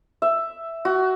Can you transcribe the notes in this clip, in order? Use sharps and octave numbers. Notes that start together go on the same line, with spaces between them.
E5
F#4